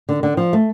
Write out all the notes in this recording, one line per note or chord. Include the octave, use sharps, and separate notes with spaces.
D3
D3
F3
A3